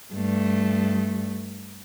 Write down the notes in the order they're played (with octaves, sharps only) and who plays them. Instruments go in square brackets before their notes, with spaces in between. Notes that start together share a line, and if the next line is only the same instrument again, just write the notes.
[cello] G2 A3